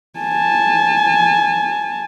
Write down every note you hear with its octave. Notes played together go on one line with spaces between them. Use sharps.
G#5 A5